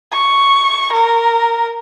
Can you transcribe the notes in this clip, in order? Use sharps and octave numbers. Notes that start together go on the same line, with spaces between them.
C#6
A#4